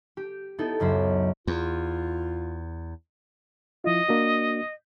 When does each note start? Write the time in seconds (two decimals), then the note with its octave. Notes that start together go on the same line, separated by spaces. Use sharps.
0.17 G4
0.58 B3 D#4 E4 A4
0.80 C#2 F#2 C5 B5
1.47 E2 F4
3.84 F3 E4 F4 D#5
4.09 A#3 D4 F#4